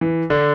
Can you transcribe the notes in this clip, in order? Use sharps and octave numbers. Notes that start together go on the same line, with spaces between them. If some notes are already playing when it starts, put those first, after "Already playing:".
E3
D3